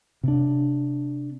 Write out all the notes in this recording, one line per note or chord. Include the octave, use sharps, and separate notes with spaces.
C3 D4